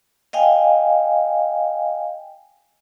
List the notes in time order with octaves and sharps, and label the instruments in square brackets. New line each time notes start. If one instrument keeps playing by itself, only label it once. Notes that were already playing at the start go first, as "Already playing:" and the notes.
[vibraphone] D#5 F5 G5 G#5